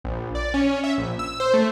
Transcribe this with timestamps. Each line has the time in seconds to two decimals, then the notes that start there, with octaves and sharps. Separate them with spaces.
0.04 A#1
0.35 D5
0.54 C#4
0.84 E5
0.98 A#1
1.19 E6
1.40 C5
1.54 A3